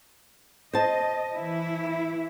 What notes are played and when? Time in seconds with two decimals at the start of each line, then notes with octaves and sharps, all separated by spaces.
0.73 C5 D#5 A5
1.35 E3 E4